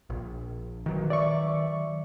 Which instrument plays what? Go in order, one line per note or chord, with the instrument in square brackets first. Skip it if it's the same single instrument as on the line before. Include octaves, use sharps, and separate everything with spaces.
[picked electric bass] A#1
D#3 F#3
[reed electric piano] D5 E5 C#6